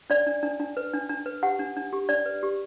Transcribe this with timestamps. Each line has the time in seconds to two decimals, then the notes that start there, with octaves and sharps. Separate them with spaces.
0.10 D4 D5
0.26 D4
0.43 D4
0.60 D4
0.77 B4
0.94 D4
1.09 D4
1.26 B4
1.43 G4 F#5
1.59 D4
1.76 D4
1.93 G4
2.09 D4 D5
2.26 B4
2.43 G4